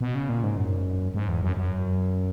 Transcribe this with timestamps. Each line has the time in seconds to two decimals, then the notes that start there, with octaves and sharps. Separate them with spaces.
0.01 B2
0.15 C#3
0.29 A#2
0.43 G#2
0.57 F#2
1.14 G#2
1.28 E2
1.43 F#2
1.57 F#2